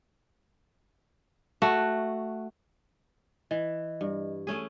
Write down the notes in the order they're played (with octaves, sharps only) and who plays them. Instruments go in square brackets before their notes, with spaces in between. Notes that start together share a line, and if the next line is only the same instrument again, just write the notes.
[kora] A3 F#4
[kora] E3 [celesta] D#5
[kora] G2
A3 C#4 G#4